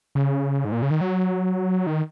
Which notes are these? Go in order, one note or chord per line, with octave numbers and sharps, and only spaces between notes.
C#3
G#2
A#2
C#3
D#3
F#3
D#3